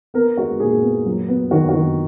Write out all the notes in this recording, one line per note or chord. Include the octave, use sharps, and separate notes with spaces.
B3 A#4
G#3 F#4
A#2 G#4
B3
F#3
B3
D#3 F#4
F#4
D#3